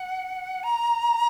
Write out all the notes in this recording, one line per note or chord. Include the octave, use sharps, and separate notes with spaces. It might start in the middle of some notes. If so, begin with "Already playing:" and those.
Already playing: F#5
A#5